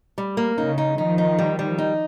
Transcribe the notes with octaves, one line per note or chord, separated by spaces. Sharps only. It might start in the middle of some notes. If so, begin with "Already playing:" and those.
G3
A#3
C#3 D#4
D#4
D#3 F3 D#4
D#4
G3
G3
D#4